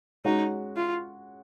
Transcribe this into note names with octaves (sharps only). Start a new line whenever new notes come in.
G#3 C#4 D#4 F#4
F4